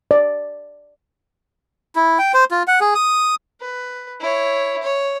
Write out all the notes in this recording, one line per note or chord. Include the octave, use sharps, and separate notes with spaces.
D5
E4
G5
C5
F4
F#5
G#4
D#6
B4
E4 C#5
C#5